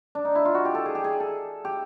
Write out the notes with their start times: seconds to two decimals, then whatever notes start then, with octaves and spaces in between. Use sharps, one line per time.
0.15 D4
0.25 D#4
0.35 E4
0.45 F4
0.54 F#4
0.65 G4
0.75 A4
0.86 G#4
0.95 G4
1.04 G#4
1.20 A4
1.65 G4